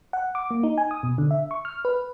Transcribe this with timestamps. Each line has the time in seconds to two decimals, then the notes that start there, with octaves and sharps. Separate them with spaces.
0.13 F#5
0.35 D6
0.51 A#3
0.63 D#4
0.78 G#5
0.91 D#6
1.03 B2
1.18 D3
1.31 E5
1.51 C#6
1.65 F6
1.85 B4